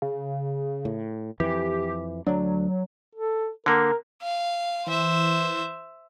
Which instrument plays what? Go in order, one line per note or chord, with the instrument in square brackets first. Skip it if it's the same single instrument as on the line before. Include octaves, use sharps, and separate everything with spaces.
[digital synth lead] C#3
[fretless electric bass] A2
[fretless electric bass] F2 E3 [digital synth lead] G4
[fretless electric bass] D2 D4 [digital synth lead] F#3
[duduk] A4
[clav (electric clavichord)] D3 A#3 [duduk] A#4
[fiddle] F5
[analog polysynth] E3 [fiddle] C5 E5